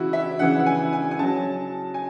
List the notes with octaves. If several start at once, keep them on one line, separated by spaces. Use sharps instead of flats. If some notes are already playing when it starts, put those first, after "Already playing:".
Already playing: C#3 E3 E4 F#4
E5
C#3 E3 F#5
F#5
G#5
G#5
G#5
C#3 F#3 A5
G#5